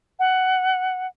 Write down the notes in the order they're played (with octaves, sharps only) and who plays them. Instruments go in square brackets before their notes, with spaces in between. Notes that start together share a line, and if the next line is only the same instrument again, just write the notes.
[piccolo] F#5